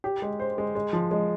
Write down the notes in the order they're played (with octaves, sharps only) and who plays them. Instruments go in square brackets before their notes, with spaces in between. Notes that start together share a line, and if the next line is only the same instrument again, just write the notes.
[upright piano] G4
G#3
C5
G#3
G#3
F3
G#3